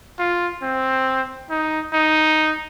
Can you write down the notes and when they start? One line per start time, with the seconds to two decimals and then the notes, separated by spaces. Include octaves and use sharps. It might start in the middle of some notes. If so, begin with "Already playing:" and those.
0.19 F4
0.62 C4
1.50 D#4
1.93 D#4